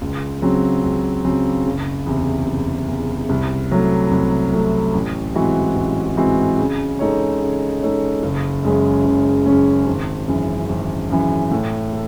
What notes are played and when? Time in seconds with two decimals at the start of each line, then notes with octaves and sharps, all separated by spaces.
0.01 C#2
0.42 C#3 F#3 C4
0.84 C#2
1.25 C#3 F#3 C4
1.66 F#1
2.06 E2 C3
2.47 F#1
2.88 E2 C3
3.29 C2
3.71 C3 F#3 A3
4.11 C2
4.54 C3 F#3 A3
4.94 A1
5.34 G#2 E3 C4 F#4
5.76 A1
6.17 G#2 E3 C4 F#4
6.58 C#3
6.99 G#3 D#4 A4 C#5
7.40 C#3
7.82 G#3 D#4 A4 C#5
8.23 F#1
8.64 F#2 C#3 G#3 C#4
9.05 F#1
9.46 F#2 C#3 G#3 C#4
9.87 G#1
10.28 F#2 C#3 E3
10.69 G#1
11.10 F#2 C#3 E3
11.51 A2
11.92 A4